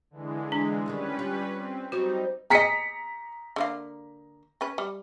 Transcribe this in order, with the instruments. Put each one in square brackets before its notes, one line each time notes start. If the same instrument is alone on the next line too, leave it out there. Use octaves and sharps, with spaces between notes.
[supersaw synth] D3 E3 G#3
[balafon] D4
[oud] D2 D3 D#3 [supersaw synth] G3 C#4 B4
[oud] F4
[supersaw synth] C4
[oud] F#3 C4 C#5 [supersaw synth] G3 D#4 [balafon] F#4
[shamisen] G#4 D#5 [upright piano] A#5 B6 C#7
[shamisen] D3 A#3 F5
C#4 B4
G3